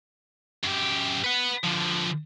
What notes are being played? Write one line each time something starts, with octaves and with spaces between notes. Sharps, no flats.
F#2 G4
B4 F#5
D3 F3